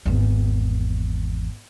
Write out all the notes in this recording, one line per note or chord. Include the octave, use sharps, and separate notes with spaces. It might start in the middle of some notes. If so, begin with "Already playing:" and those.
G#1 E2